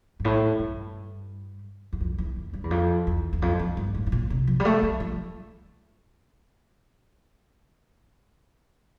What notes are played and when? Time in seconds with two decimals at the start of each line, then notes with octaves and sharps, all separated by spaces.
0.20 G2
0.24 A2
0.59 G2
1.93 E2
2.01 F2
2.18 E2
2.36 F2
2.53 G2
2.64 E2
2.71 F2
3.07 E2
3.33 E2
3.42 F2
3.59 F2
3.77 G2
3.95 A2
4.06 A2
4.12 A#2
4.30 C3
4.47 F3
4.60 G3
4.65 A3
4.83 G3
5.00 F3